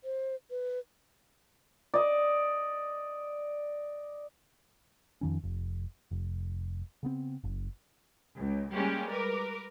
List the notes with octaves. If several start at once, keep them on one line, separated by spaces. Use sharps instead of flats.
C5
B4
D5 D#5
F2 D#3 C#4
F1
F1
C#3 B3 C4
F#1
C#2
G3 G#3 A#3 C#4 G4
A#4 B4 D6